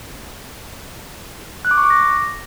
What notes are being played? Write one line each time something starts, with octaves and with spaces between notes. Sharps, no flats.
F#6
D6
C#6
D6
A#6